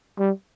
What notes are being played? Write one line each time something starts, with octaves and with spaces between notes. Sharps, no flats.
G3